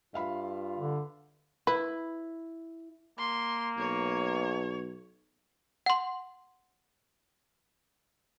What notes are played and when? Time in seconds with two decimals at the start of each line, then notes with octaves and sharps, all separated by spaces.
0.14 G2 F4 E5 F5 B5
0.77 D3
1.67 E4 B4
3.18 A#3 C6
3.78 B1 C#5
5.86 F#5 C6